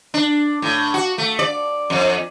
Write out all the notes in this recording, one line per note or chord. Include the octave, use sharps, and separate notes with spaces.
D4
A2
F#4
A3
D5
F2